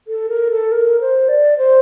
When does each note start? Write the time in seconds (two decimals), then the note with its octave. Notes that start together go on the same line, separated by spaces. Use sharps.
0.08 A4
0.29 A#4
0.50 A4
0.72 A#4
1.01 C5
1.29 D5
1.58 C5